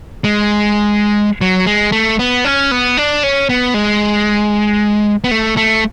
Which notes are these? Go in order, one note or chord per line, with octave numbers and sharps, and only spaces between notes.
G#3
F#3
G#3
A3
B3
C#4
B3
D4
C#4
B3
G#3
B3
A3
A3